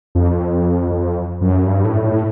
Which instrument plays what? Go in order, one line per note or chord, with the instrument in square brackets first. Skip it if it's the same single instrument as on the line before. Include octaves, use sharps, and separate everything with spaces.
[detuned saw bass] F2
F2
F#2
G2
A2
A2